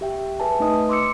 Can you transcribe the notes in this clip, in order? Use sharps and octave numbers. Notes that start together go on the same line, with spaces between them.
G4 E5 G5
G#4 B4 E5 G#5 A5
A3 D#4 B4 D#5 D#6
C6 D6 E6 C#7